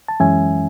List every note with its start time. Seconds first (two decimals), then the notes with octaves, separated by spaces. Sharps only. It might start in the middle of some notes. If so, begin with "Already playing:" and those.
0.08 A5
0.20 F#2 E3 G#3 C#4 E5 G#5